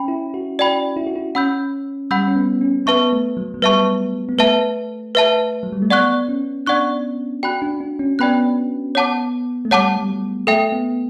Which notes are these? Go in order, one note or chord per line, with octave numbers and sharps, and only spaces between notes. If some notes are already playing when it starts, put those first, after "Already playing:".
Already playing: C#4 G5 B5
E4
F#4
F#4 D5 G5 B5
E4
F#4
E4
C#4 F#5 B5 E6 G6
G3 F#5 B5 E6 G6
C#4
B3
C#4
B3 B4 E5 A5 C#6
A3
F#3
F#3
G3 B4 E5 A5 C#6
B3
A3 B4 E5 A5
B4 E5 A5
F#3
G3
A3
B3 D5 F#5 C#6 F#6
C#4
D4 D5 F#5 C#6 F#6
F#4 D5 G5 B5 F#6
D4
D4
C#4
B3 D5 G5 B5 F#6
C#5 F#5 A5 D6
A3
G3 C#5 F#5 A5 D6
G3
F#3
A3 A4 E5 G5
B3